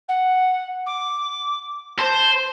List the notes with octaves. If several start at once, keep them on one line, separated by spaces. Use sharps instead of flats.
F#5
D6
C5 A5